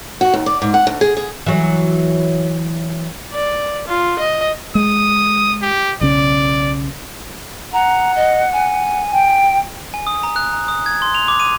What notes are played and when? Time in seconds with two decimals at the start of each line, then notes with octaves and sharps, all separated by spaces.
0.21 F#4
0.34 D#2
0.46 D5
0.62 G#2
0.74 F#5
0.87 D2
1.01 G#4
1.17 G#4
1.46 E3 F#3
3.33 D5
3.88 F4
4.19 D#5
4.75 G#3 D#6
5.62 G4
6.01 B1 C#3 C#4 D5
7.73 F#5 A#5
8.16 D#5
8.53 G#5
9.13 G5
9.94 G#5
10.07 D#6
10.23 A#5
10.36 F#6
10.53 A#5
10.68 D#6
10.86 G#6
11.02 C6
11.15 F7
11.28 D6
11.40 D#7